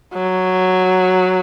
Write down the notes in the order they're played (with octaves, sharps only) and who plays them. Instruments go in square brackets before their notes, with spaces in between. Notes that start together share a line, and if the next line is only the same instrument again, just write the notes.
[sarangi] F#3